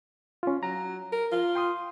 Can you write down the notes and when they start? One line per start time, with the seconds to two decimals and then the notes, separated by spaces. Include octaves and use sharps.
0.43 C#4 F4
0.63 F#3 A#5
1.12 A#4
1.32 F4
1.55 G5 C6 D#6